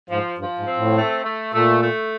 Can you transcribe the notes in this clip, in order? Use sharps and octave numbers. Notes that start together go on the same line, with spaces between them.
G#2 F3
G2 F3
G#2
C4
A2
A3
A3
A#2 A3
A3